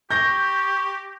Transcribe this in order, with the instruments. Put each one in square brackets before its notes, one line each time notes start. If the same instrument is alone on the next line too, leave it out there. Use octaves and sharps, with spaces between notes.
[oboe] G4 [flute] C#6 [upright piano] G6 A#6 G7